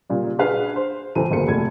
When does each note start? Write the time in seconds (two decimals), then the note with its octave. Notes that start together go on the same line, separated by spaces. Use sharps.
0.09 A#2 C#3 G3
0.38 D4 F#4 G#4 B4 F5
0.76 C5
1.15 F#1 C#2 E3 A4 C5 D#7
1.31 G1 D2 A#3 G#4 C5 C#7
1.48 F1 A3 G#6